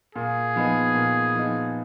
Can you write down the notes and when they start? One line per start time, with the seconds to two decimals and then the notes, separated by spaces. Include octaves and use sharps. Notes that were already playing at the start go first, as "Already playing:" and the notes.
0.15 A#2 G#4
0.56 F3 B3 D#4
0.95 A#2
1.35 F3 B3 D#4